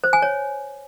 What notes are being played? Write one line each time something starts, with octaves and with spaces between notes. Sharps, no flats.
C5
G#5
C#5